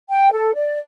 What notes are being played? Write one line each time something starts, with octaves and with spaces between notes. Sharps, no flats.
G5
A4
D5